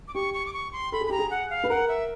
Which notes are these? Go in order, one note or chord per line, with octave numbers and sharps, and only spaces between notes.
D6
G4 C#6
C#6
D6
C#6
C6
A4 B5
G#4
B5
G4 A#5
G#4
F#5
F5
B4
A#4 F#5
E5